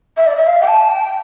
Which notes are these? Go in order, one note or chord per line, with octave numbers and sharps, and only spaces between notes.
E5
D5
E5
F5
G5
A5
G5